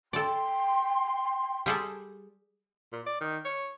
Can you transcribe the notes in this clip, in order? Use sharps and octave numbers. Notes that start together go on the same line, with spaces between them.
A4 D5 G5 C6
G3 G#4 A4
A#2
D5
D#3
C#5